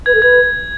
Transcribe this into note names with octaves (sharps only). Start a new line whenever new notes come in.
B4 G#6
A4
B4 G#6